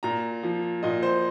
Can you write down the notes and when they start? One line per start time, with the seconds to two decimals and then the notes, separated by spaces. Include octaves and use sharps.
0.03 A#2 A#5
0.43 F3
0.83 A#2 D#5
1.03 C5